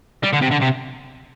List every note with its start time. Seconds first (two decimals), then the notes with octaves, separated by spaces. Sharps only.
0.23 G3
0.33 D3
0.41 C3
0.51 D3
0.61 C3